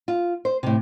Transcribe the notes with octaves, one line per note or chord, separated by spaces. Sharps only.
F4
C5
A2 C3